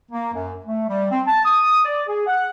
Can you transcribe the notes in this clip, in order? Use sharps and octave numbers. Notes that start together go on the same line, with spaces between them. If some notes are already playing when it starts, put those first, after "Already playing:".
A#3
F#2
A3
G3
C4
A5
D#6
D5
G#4
F#5